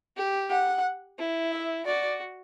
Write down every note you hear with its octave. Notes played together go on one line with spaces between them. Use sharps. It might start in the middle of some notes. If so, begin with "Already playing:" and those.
G4
F#5
E4
E5
F#4 D5